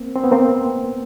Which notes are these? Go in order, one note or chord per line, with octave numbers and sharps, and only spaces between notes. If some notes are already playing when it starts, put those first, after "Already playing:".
Already playing: A#3 C4
C4
B3
A#3 C4